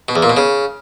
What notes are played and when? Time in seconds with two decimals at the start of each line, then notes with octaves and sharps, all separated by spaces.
0.09 B2
0.16 E2
0.23 A#2
0.30 B2
0.37 C#3